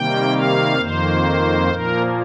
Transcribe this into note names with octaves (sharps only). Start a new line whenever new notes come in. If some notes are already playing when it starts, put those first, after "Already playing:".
Already playing: C3 D#3 G3 A#3 G5
F5
F2 D#3 A#3 C5
A#2 F3 A#3 A#4